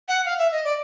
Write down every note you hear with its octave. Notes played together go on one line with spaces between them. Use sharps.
F#5
F5
E5
D#5
D5